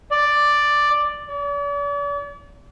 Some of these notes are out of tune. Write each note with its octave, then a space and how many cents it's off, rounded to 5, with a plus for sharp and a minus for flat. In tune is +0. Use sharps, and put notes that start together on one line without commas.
D5 +5
D5 -45